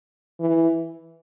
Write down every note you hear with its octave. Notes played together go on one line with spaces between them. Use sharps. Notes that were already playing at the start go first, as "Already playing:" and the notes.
E3